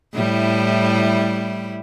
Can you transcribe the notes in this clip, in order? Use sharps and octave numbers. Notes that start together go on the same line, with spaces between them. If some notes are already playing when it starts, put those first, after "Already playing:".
A2 G3 E4